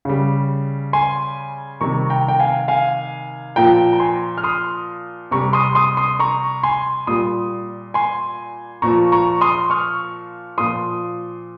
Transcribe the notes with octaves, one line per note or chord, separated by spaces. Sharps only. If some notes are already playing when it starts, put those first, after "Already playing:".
C#3 G3
G#5 C6
C3 D#3 G3 A#5 C#6
G5 A#5
G5
F5 G#5
F5 G#5
A#2 F3 G5 A#5
A#5
G#5 C6
F6
C6 D#6
C3 G3 A#5 C#6
C6 D#6
C6 D#6
C6 D#6
A#5 C#6
G#5 C6
A#2 G3 C6 D#6
G#5 C6
A#2 F3 A#5 C#6
A#5 C#6
C6 D#6
C#6 F6
A#2 F3 C6 D#6